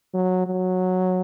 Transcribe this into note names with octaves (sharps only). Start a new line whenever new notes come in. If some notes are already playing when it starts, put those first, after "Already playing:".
F#3
F#3